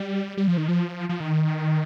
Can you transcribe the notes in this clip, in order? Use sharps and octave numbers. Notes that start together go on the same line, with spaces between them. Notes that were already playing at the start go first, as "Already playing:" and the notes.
Already playing: G3
G3
F3
D#3
F3
F3
D#3